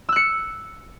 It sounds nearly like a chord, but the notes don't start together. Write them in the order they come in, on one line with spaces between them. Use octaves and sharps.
E6 F#6 C#7